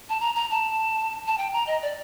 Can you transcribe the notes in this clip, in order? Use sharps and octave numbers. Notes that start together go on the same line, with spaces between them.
A5
A#5
A#5
A5
A5
G5
A#5
D#5
D5